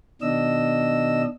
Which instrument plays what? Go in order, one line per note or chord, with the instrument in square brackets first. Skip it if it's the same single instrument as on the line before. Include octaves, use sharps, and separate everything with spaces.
[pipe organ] B2 D#3 D4 D#5 E6